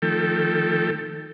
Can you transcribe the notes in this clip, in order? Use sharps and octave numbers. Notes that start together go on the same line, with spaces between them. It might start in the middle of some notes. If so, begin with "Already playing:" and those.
D#3 F3 A3 A4 G5